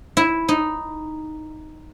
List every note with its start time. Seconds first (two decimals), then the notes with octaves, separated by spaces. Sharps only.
0.17 E4
0.48 D#4